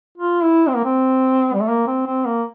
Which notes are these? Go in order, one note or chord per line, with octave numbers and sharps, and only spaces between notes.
F4
E4
C4
A#3
C4
G3
A3
A#3
C4
C4
A#3